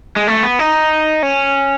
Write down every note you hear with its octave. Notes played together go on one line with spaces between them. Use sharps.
G#3
A3
B3
D#4
C#4